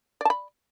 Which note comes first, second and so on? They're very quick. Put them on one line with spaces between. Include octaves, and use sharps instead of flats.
D5 A5 B5